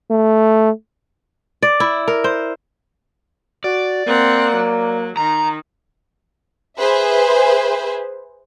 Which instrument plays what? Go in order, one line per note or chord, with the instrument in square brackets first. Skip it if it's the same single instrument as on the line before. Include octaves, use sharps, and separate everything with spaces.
[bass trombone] A3
[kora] D5
E4
A#4
C5
[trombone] F#4 [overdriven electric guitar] D5
[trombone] A#3 [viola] C4 F#5
[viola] F#3
[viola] D#3 [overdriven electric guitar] A#5
[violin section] G#4 B4 C5 E5